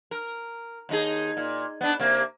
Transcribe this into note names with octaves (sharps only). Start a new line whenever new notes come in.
A#4
D#2 D#4 G#4
A#2
B3 D4
C3 A#3